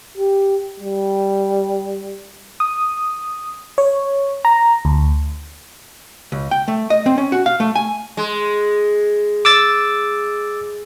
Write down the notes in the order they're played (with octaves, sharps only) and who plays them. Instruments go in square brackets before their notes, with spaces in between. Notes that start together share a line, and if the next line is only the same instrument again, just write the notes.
[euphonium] G4
G3
[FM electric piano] D#6
C#5
A#5
D2
[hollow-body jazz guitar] C#2
G5
A3
D#5
C4
C#4
F#4
F5
A3
G#5
[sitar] G#3
[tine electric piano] D6 E6 A6